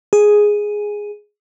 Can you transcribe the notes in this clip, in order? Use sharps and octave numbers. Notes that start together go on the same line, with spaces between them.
G#4